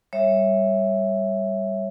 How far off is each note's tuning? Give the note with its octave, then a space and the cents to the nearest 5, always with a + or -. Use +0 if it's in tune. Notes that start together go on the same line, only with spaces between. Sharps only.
G3 +0 C#5 -15 E5 +0